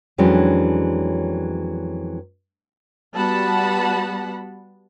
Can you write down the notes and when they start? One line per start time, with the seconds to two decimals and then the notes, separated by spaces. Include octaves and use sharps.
0.18 F2 E3 F#3 G#3 C#4 D4
3.15 G3 B3 F#4 F#5 A5 B5